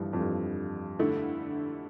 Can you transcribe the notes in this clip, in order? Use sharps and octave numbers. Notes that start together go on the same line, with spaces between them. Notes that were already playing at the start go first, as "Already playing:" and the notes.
Already playing: G2 D3 E3 F3
F2
G2
D3 A3 E4